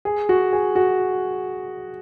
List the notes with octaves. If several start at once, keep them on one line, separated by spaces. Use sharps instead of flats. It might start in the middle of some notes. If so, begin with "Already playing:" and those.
G#4
F#4
G#4
F#4